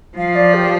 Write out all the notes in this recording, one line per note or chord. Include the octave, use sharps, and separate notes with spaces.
F3 F5
D5
G4